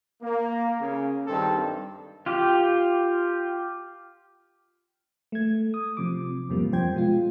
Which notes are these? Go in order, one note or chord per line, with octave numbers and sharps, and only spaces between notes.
A#3
C#3
G2 D#3 C4 A4
F4 G4
A3 G#6
D#6
C3 F3 D6
E2 G2 C3 F3 G3 A#3
F2 F3 C5 G5 G#6
B2 G#3 F4